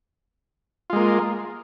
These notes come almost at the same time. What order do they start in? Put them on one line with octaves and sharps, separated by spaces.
F4 G#3 A#3